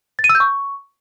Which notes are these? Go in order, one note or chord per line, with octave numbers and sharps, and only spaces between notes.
A6
D#7
E6
G6
C#6